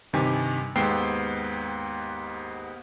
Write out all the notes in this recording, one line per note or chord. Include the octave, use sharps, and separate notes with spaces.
G2 C3 D#3 G4 G#5
D#2 G#2 B3 G5 E6 C7